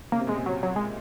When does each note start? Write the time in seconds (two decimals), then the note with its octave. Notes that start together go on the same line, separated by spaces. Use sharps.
0.12 C#3 A#3
0.19 C3
0.27 A#2 G#3
0.35 C3
0.46 F#3
0.63 F#3
0.76 G#3